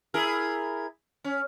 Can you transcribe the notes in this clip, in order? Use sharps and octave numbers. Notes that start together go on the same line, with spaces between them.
E4 G#4 A#4
C#4